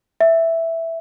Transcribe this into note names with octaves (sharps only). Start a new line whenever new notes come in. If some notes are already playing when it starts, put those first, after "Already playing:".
E5